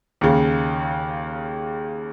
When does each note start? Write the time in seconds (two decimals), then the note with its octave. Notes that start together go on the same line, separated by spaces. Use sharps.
0.21 D#2 C#3